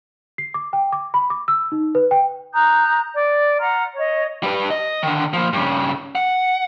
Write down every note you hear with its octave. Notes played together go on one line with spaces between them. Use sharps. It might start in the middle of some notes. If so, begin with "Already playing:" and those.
C7
D6
G5
D6
B5
D6
E6
D#4
B4
G5
A#5 D#6 F#6 G6
D5
F#5 A#5 C6 F6
C#5 D#5
G3 B4
D#5
D3 D#3
F3 A#3
G2 C#3
F#5